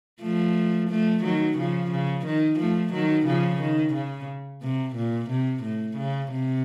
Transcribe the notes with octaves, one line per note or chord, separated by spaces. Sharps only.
F3 A3
F3 A3
D#3 F#3
C#3 F3
C#3
D#3
F3 A3
D#3 F#3
C#3 F3
D#3
C#3
C3
A#2
C3
A2
C#3
C3